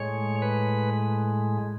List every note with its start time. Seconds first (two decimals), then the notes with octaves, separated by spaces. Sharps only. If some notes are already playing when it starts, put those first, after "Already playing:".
Already playing: A2 G#3 C#5
0.42 B4